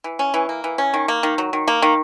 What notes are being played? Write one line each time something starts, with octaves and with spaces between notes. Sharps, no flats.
E3
C#4
E3
A#3
E3
C#4
D#3
A#3
D#3
F#3
D#3
A#3
D#3